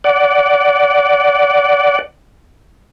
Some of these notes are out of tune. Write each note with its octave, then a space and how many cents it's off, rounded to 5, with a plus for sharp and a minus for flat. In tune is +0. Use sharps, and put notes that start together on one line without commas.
D5 -20 F#5 +0